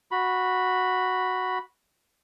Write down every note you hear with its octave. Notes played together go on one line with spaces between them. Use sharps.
F#4 B5